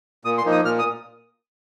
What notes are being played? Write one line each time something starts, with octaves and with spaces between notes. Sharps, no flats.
A#2 D#6
C6
F3 A#3 D#4
D#6
A#2 F6
D#6